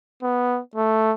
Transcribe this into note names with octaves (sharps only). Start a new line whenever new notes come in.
B3
A3